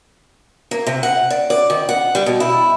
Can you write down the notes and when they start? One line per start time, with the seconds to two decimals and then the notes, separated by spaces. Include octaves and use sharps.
0.71 A#3
0.87 C3
1.03 F#5
1.30 D5
1.50 D5
1.70 D#3
1.89 F#5
2.15 G3
2.26 B2
2.40 E4